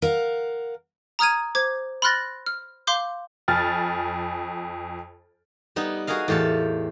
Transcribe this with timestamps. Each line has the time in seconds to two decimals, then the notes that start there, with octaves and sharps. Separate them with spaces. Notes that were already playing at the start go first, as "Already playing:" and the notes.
0.02 A#4 F5 F#5
1.19 A#5 D#6 F6 G#6 D#7
1.55 C5 D6 G#6
2.02 B5 C6 F6 F#6 A6 A#6
2.46 F6
2.87 F5 C6 D6 G6
3.48 F2 G#5 F6 A6
5.76 G3 B3 D#4
6.07 F#4 G#4 A#4 D#5 F5
6.28 E2 A2 G4 A4 F5